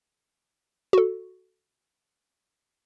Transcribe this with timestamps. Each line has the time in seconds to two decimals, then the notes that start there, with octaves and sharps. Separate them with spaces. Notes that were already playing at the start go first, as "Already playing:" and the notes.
0.93 F#4 A4